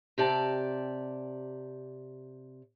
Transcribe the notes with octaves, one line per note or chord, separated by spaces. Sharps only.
C3 G4 D5 A5